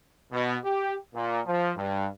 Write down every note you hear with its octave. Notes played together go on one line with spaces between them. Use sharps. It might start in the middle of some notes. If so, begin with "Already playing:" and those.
B2
G4
A#2
F3
G2